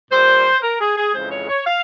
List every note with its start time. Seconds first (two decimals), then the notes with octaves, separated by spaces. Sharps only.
0.10 A#2 G3 C5
0.62 A#4
0.80 G#4
0.97 G#4
1.13 F2 C#3 E3 G#3 C5
1.31 C#5
1.48 C#5
1.65 F5